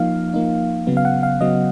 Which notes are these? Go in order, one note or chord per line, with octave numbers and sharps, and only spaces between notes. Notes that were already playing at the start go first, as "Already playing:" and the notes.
Already playing: F3 A#3 D#4 F5
F3 A#3 D#4
C#3 F#3 B3
F5
F#5
F5
C#3 F#3 B3 D#5